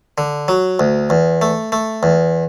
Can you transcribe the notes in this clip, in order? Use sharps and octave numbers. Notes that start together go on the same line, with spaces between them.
D3
F#3
D2
E2
A3
A3
E2